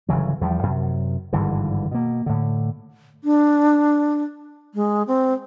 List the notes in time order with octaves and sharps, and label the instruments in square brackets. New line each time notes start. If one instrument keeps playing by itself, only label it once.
[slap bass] G1 C#3 E3 F#3
E2 F3 G3
F#2 C3
G#1 G2 D3 E3
B2 A#3
A2 D3
[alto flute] D4
G#3
C4